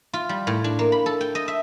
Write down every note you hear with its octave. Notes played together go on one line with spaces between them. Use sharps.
F4
G3
A2
D4
A#3
B5
A4
G5
D#5
E5